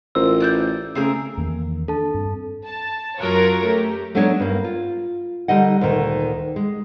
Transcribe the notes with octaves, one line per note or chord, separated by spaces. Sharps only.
A1 F4 A#4 C5 E6
D5 F#6 G6
C#3 A3 C4 G#4 A#4
E2 D#3 A#3
D4 A4 A5
G2 C4
A5
F#2 F#3 F4 A#4 C#5
A3 G4
F#3 A3 B3 D4 D#4 C#5
G2 A#3
F4
D3 G3 D#4 D#5 F#5
D2 A#2 D#3
G#3